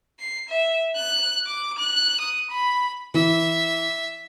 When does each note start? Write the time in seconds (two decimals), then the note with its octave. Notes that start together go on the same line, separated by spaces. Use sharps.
0.20 C7
0.49 E5
0.96 F#6
1.46 D6
1.79 F#6
2.21 D#6
2.51 B5
3.14 E3 E5